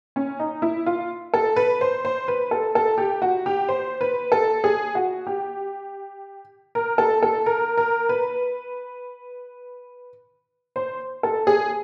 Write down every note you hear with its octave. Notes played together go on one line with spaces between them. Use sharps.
C#4
D#4
E4
F4
A4
B4
C5
C5
B4
A4
A4
G4
F#4
G4
C5
B4
A4
G#4
F#4
G4
A#4
A4
A4
A#4
A#4
B4
C5
A4
G#4